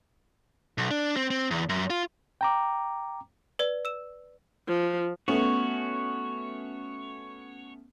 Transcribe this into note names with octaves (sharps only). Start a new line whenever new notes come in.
B1
D4
C4
C4
E2
F#2
F4
G5 A#5 D6
B4 D5
E6 E7
F3
A3 B3 C#4 F#4 C#5